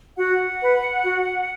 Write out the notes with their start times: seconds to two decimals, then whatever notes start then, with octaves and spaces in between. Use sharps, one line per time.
0.18 F#4 F#5
0.61 B4
1.03 F#4